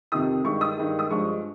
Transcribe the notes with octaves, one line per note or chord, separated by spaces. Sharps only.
F2 C3 D#3 D#6
G2 D#3 G#3 C#6
D#6
G2 D#3 G#3
D#6
G2 F3 G#3 C#6